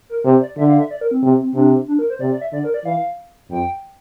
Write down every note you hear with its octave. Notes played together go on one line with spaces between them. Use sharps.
A#4
C3 C5
D5
D3 E5
F5
E5
D5
A#4
C4
C3 C4
C4
C3 D4
D4
A#4
C5
C3 D5
D5
E5
D3 D5
A#4
D5
E3 F5
F2 G5